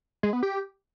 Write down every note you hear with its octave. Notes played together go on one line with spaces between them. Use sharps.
G#3
B3
G4